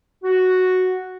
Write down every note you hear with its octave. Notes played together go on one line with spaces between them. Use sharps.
F#4